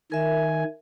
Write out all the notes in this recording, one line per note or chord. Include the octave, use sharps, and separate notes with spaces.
D#3 A#4 E5 G#5